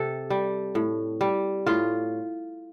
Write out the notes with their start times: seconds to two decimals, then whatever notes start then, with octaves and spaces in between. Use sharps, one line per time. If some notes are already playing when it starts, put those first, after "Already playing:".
Already playing: C3 A4
0.30 G3
0.75 A2
1.21 G3
1.66 A2 F4